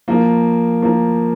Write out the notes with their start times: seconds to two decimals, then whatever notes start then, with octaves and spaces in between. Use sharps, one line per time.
0.08 F3 A#3
0.82 F3 A#3